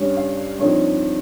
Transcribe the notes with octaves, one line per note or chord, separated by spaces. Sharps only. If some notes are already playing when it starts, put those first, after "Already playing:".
Already playing: G2 G3 C#4 C#5
F5
G2 F3 C4 D#4 C#5